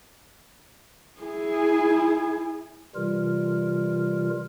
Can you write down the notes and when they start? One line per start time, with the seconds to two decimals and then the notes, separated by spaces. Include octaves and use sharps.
1.21 E4 G#4
2.95 C3 E3 G3 F4 A#4